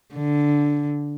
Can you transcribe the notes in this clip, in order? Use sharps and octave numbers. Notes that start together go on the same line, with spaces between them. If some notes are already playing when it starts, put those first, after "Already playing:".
D3